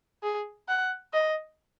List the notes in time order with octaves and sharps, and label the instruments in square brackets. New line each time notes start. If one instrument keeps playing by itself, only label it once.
[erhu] G#4
F#5
D#5